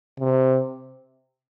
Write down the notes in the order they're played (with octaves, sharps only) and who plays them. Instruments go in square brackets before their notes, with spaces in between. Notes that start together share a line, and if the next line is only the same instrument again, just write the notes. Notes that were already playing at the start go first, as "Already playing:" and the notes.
[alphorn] C3